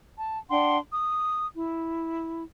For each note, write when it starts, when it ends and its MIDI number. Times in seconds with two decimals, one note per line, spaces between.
0.18 0.38 81
0.49 0.77 62
0.49 0.77 78
0.49 0.77 79
0.49 0.77 84
0.92 1.46 87
1.54 2.43 64